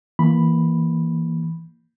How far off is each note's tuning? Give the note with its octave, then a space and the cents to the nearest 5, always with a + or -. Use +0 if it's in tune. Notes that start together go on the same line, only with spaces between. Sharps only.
E3 +0 A#3 +0 B5 +0